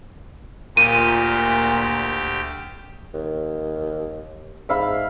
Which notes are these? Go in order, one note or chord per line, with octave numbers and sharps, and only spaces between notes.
D2 A#2 G4 D#7
D#2
G#2 E5 F5 B5